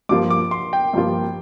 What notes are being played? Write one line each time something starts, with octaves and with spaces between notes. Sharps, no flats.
G2 F3 A#3 F4 D6
D6
C6
G5
G2 F3 A#3 F4